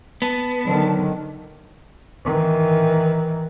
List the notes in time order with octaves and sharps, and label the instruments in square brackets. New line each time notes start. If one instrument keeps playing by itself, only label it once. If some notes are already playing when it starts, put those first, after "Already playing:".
[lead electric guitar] B3 [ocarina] A5
[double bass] D3 D#3 [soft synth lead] F#3
[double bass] D#3 E3